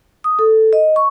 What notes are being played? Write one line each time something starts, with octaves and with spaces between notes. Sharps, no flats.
D#6
A4
D#5
C#6